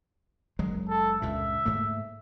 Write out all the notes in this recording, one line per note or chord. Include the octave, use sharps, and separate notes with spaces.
F#1 F#3 G#3
A4
C#2 G2 A#2 E5
G#2 A3 A#3